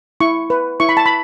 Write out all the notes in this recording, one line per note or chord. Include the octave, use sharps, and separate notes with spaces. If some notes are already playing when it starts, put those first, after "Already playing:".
E4 C#6
B4
E4 C#6
B5
A5
B5